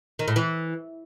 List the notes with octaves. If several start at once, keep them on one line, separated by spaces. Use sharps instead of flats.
D#3
A2
E3